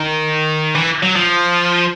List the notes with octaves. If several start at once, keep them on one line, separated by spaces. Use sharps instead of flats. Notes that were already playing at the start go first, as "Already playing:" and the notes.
Already playing: D#3
E3
F#3
F3